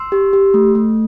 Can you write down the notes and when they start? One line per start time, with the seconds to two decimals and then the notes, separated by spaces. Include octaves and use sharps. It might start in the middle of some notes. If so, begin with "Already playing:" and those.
Already playing: C6 E6
0.12 G4
0.33 G4
0.54 A3
0.75 A3